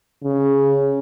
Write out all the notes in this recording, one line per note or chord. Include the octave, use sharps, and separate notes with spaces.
C#3